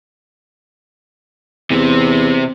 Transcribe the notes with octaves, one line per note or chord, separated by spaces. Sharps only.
E2 C3 C4